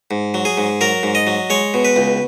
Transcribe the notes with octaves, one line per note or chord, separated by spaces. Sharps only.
G#2
F#3
G#4
G#2
F#3 A#4
G#2
D#5
F#3
G#3 C#5
B2
B4
C#2